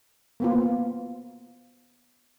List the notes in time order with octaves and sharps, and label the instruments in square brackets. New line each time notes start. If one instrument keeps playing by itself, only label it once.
[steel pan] A#3 B3 F4